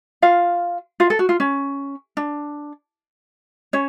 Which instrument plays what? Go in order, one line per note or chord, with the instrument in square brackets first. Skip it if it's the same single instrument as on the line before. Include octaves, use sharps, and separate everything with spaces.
[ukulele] F4 F5
F4 F5
A4
F#4
F4
C#4
D4
C#4 C#5